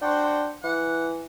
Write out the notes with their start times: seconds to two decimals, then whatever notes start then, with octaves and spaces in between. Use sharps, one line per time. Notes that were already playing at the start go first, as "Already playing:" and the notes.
0.02 D4 F#4 C5 G5
0.64 E3 F#5